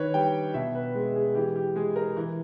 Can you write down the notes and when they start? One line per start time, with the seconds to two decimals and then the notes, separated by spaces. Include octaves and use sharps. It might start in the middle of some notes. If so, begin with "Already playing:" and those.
Already playing: D#3 B4 C#5
0.14 G3 G5
0.54 B2 E5
0.75 B4
0.95 G#3
1.15 G#4
1.35 E3 G4
1.56 G4
1.76 G#3 G#4
1.96 A#4
2.16 E3